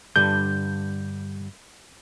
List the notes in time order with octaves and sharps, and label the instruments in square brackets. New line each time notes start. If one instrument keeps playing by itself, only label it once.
[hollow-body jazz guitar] G2 D3 G3 [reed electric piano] G6